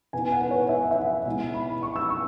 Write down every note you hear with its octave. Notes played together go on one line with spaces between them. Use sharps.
B2 B3 E4 G#5
F#5
B4
C#5
E5
E5
F#5
B2 G#3 E4
B5
C#6
E6
C#6